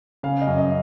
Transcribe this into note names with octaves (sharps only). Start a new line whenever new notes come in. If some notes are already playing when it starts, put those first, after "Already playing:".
C#3 F5
D#5
F#2
D#5